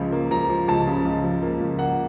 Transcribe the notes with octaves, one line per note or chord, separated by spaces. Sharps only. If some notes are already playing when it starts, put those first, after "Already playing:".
Already playing: C#2 C#3 F3
A#3
F3 A#5
F3
C#2 A5
C#3
C#2
F3
A#3
C#2
A#3 F#5